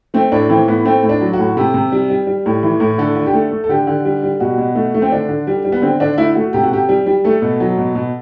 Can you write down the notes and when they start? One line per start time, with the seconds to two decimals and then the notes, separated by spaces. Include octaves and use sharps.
0.14 A3 C4
0.32 A2 D4
0.49 E3 C4
0.68 A2 B3
0.85 A3 C4
1.03 A2
1.09 D4
1.21 F#3
1.33 F#4
1.39 A2
1.57 C3 G4
1.74 C3
1.92 G3
2.10 G3
2.27 G3
2.46 A2
2.63 E3
2.80 A2
2.98 D3 A4
3.16 D3
3.26 G4
3.33 A3 A4
3.51 A3
3.64 A4
3.69 D3 G4
3.87 D3
4.05 G3
4.23 G3
4.40 B2 F#4
4.58 B2
4.75 A3
4.94 A3
5.02 C4
5.12 D3 D4
5.29 D3
5.47 G3
5.64 G3
5.72 B3
5.82 D3 C4
6.00 D3 D4
6.18 A3 E4
6.35 A3 F#4
6.53 C3 G4
6.63 F#4
6.71 C3 G4
6.89 G3
7.06 G3
7.24 A3 A4
7.42 B2
7.60 F#3
7.78 B2
7.95 B2